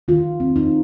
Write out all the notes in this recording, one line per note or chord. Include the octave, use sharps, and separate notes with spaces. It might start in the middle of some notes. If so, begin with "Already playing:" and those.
D#3 F4
C4
D#4